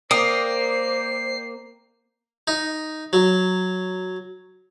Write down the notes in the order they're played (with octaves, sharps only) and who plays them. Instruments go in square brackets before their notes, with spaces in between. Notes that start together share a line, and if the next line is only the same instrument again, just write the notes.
[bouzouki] A#3 [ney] C5 [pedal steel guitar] D5 G5 D#6 [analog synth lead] C7
[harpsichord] D#4
F#3